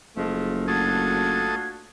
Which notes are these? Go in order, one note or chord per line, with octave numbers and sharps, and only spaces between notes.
F#1 F3 G#3 A3
A3 D4 F4 F#4 A4 D#6 G#6